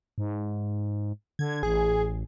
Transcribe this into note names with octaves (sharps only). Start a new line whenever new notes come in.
G#2
D3 G#6
A1 G#4